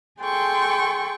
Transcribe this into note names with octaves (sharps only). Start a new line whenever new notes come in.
G#4 A4 G5 C6 C#6